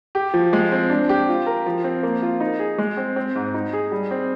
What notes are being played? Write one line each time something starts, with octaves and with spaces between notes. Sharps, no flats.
G4
F3
G#3
C4
D4
G4
F4
A#4
F3
C4
A#3
F4
D#4
G#4
G#3
C4
C4
G#2
D#4
G#4
G3
C4